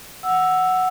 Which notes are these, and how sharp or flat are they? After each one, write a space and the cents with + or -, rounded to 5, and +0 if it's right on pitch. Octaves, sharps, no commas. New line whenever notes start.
F#5 +0 E6 +0